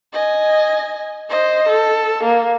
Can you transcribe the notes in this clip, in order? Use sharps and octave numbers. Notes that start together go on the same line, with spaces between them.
D#5 G#5
C5 D#5
A4
A#3